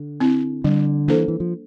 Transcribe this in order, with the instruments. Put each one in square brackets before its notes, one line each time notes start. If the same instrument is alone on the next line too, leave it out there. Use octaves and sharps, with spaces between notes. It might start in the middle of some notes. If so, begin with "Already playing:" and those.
Already playing: [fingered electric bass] D3
[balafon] C4 E4
[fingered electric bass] D3 [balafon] G3
[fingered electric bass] E3 [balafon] A#3 D4 A4 C5
[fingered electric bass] E3
F3